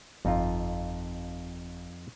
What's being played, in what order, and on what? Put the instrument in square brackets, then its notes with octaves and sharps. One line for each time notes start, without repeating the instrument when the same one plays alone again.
[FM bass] G1 [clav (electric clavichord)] F2 D#4 F4